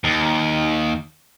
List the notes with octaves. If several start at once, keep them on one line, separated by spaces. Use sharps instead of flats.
D#2